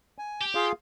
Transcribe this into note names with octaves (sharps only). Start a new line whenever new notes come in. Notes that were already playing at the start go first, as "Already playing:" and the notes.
G#5
G4
F4 G#4 F5